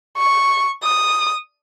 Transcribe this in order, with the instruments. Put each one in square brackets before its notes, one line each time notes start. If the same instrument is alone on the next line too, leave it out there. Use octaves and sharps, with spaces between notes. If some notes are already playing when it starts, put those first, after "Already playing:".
[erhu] C#6
D#6